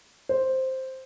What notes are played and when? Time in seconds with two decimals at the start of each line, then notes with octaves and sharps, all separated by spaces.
0.29 C5